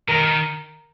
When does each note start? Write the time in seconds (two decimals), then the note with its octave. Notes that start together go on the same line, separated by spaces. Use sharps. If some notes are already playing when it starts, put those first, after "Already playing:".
0.08 D#3 A#4
0.23 D#3